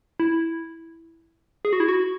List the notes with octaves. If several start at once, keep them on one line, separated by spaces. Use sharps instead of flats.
E4
G#4
F#4
E4
F#4